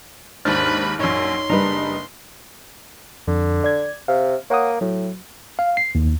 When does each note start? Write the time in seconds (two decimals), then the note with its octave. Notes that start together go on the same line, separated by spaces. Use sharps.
0.45 D#2 G#2 D4 B4 C5 B5 F6 A6
0.99 A#1 F#2 D#4 C#5 C6
1.50 F#1 G3 D4 D#4 B4 A#5
3.28 F2 D3
3.64 D5 G#6
4.08 C3 F5
4.50 A#3 C#5 F#5 D#6
4.81 A2 F#3
5.59 F5
5.77 C7
5.95 D#2